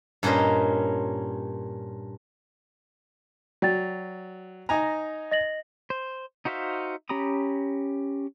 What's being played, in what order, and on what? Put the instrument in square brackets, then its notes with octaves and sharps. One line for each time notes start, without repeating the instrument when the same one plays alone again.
[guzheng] G2 A#2 C#4 C5 D#5
[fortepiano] F#3 [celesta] D5 G5 A6
[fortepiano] D#4 G#5 A#5
[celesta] D#5 A#6 F#7
[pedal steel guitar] C5
D#4 F#4 C5 E5 F5
C#4 G4 A#5 B5 D#6